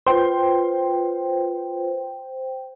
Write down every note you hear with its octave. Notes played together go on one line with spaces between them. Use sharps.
F4 B4 C5 G5 C6